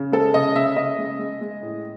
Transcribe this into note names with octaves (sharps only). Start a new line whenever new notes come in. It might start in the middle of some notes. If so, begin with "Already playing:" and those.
Already playing: C#3
G#3 A4
C#3 D#5
C#3 E5
C#3 D#5
G#3
G#3
G#3
A2